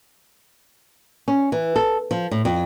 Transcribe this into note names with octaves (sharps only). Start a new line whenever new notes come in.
C#4
E3
A4
F3
A2
F2